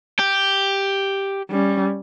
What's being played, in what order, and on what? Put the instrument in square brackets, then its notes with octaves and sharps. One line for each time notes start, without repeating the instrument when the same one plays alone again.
[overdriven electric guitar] G4
[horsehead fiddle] G3 C#4